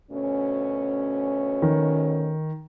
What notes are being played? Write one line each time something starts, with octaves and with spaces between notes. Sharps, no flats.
D2 B2 C#4
D#3